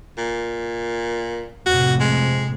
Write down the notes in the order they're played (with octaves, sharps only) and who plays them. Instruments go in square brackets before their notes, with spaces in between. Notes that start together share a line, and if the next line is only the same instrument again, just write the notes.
[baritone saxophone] A#2
[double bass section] F2 A2 C3 [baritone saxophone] F#4
[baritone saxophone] G#3